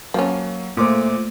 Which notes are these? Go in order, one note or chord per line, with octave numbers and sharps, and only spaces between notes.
F3 F#3 A#3 C#4
A#2 A3 A#3 C5 D6